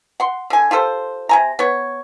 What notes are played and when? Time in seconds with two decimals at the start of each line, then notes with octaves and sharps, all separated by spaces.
0.20 F#5 C6
0.50 D3 G#5
0.71 F4 G4 A4 C5
1.29 C3 G#5 A#5
1.59 B3 C#5